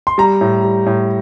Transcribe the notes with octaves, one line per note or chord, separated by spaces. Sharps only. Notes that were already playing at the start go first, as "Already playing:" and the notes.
C6
G3 A#5
A2
G3
A2